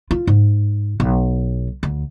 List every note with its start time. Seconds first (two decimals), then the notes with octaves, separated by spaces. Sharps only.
0.11 F4
0.27 G#2
1.00 B1
1.83 D2